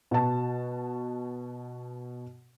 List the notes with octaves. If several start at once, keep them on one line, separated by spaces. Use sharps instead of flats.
B2 F#4 A5